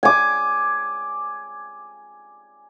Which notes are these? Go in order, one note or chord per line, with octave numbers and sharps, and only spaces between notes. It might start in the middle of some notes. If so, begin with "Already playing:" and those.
G#5 D6